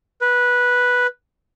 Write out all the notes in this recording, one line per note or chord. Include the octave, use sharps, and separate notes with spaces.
B4